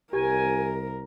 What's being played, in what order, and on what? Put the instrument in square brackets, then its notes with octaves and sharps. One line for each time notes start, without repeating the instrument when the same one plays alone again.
[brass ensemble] C2 [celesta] G4 [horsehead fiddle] A#4 [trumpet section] G#5